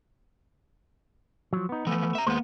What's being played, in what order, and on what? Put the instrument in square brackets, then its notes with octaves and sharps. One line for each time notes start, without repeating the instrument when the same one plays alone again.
[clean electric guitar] F3 F#3
B3 D#4
[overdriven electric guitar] E3 F3 [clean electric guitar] A3 B3
[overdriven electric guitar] E5 A#5
[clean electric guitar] D#2 G#3 C5 [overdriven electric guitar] A#3 B3